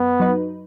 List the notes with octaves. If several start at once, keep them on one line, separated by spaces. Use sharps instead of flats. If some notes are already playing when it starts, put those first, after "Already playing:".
Already playing: F#2 B3
F#3 D#4 B4